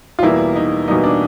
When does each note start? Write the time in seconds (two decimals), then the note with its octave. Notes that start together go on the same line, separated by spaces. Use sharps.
0.19 F4
0.23 E2 B2 G3 A#3 E4
0.56 D#4
0.88 E2 B2 G3 A#3 D#4
1.04 D4